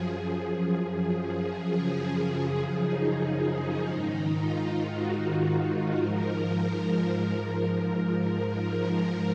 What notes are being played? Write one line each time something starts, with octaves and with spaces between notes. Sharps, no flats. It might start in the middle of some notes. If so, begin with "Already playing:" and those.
Already playing: F#2 F3 G#4
G#4
F#2 C#3 F3 G#4
D#4
D#4
G#2 D#3 D#4
F4
F#4
G#2 F3 A#4